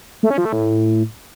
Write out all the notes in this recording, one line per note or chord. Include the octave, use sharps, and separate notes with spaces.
A3
C#4
F3
A3
A2